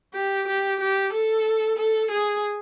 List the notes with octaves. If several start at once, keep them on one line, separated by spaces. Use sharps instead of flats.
G4
G4
G4
A4
A4
G#4